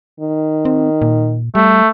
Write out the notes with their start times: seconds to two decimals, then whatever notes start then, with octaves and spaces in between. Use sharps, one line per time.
0.20 D#3
0.65 C4
1.02 A#2
1.55 G3 A3